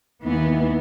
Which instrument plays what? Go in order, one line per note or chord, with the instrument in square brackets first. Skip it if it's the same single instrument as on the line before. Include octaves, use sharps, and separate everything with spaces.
[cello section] D#2 E3 B3